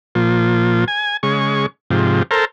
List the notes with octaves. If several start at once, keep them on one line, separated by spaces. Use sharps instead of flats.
A#2 F3
G#5
C#3 G#3 C#6
G#2 C3 F3
A4 A#4 C5